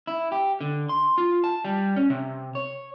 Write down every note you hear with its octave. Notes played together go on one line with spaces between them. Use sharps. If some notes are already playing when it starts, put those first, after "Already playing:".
E4
G4
D3
C6
F4
A5
G3
C#4
C3
C#5